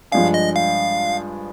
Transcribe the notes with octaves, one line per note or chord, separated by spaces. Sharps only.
G2 F3 G#3 D4 G#4 F5
D#5
F5